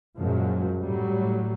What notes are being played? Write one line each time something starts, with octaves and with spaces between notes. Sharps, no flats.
F#2 A#2 F3 F#3 G#3
A2 F#3 G3